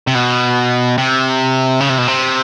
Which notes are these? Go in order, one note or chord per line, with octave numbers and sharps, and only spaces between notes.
C3
B2
C3
C#3
C3
B2
C3